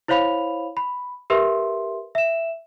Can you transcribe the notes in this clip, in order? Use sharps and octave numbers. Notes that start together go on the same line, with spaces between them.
E4 C5 C#5 F5 B5 F7
B5
G4 A#4 B4 E5 C6
E5 E7